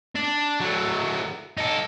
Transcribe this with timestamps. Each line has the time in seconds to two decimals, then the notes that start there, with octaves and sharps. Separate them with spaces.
0.16 D4
0.61 F#3 A3
1.58 D#4 A4